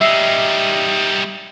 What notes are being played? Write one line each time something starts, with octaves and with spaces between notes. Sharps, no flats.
G3 D#4 E5 E6 C7